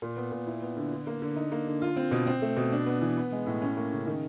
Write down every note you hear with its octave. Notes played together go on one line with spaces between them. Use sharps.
A#2
B3
A#2
E4
B3
D3
D3
A#3
D3
D#4
A#3
D3
F4
C4
B2
C4
A3
B2
D4
B3
E3
B3
G#3
A2
C#4
A#3
C#3
D#3